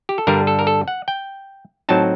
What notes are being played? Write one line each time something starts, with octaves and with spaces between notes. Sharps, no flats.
G4
A4
G2 D3 G3 D4 A#4
A4
A#4
A4
F#5
G5
A2 F#3 C4 D#4 A5